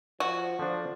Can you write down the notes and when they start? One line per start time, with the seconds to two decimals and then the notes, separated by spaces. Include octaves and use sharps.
0.20 F3 F#4
0.59 F3 D4 A4